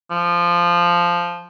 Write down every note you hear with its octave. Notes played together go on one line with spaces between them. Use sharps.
F3